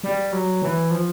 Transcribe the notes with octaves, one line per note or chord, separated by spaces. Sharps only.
G3
F#3
E3
F3